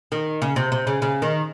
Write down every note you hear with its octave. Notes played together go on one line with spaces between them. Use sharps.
D#3
C#3
C3
C3
C#3
C#3
D#3